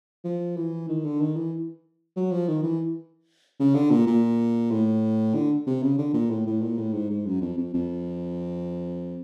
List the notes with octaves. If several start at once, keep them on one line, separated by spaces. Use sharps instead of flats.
F3
E3
D#3
D3
D#3
E3
F#3
F3
D#3
E3
C#3
D3
A#2
A#2
A2
D3
C3
C#3
D3
A#2
A2
A2
A#2
A2
G#2
G#2
F#2
F2
F2
F2